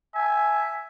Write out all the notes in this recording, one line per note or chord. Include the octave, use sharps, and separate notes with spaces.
E5 G#5